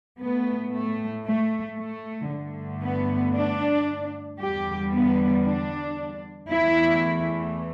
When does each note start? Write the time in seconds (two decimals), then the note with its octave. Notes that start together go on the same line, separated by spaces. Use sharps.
0.19 A2 A3 B3
0.72 A3
1.24 A3
1.76 A3
2.29 G2 D3 A3
2.82 B3
3.34 D4
4.39 E2 D3 G3 G4
4.91 B3
5.44 D4
6.49 E2 E3 A3 E4